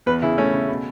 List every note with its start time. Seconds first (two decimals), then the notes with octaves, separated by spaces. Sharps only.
0.06 E2 B4
0.22 C#3 E4
0.38 A3 C#4
0.53 C#3
0.68 B2